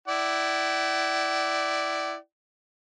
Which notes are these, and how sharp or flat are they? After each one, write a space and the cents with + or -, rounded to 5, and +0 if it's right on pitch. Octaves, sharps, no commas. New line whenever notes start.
E4 +0 D5 +0 F#5 +45